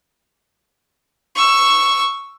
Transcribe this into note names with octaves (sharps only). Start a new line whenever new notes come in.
C#6 E6